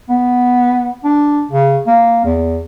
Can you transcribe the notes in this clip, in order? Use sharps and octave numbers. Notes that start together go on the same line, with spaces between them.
B3
D4
C#3
A#3
E2